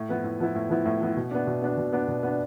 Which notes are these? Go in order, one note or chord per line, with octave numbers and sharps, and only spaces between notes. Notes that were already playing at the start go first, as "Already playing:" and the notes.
Already playing: A2
F3 B3 E4
A2
F3 B3 E4
A2
F3 B3 E4
A2
F3 B3 E4
B2
B3 D4
B2
B3 D4
B2
B3 D4
B2
B3 D4